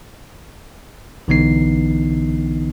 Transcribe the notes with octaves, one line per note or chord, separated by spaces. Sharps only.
B1 D3 E3 B3 D#4 C7